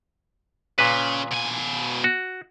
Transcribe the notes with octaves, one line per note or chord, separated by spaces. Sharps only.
A#2 C#3 B4
B2 G#5
F#4